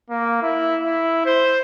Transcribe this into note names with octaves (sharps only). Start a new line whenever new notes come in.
A#3
E4
E4
C5